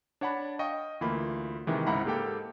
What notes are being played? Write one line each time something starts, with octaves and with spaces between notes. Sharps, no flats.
D4 C#5 F#5 A5 B5
D#5 F5 G5 C#6
D2 E3 A#3 F4 B5
C3 D#3 E3 G#3
C#2 G#2 E4 F#5 A#5 B5
G#2 A#3 G4 A4 G5